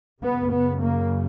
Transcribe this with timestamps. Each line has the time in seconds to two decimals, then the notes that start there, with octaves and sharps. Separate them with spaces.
0.22 F#2 C#3 B3
0.52 B3
0.81 A#3